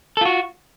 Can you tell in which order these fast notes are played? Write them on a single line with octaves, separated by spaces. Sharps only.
A4 F4 F#4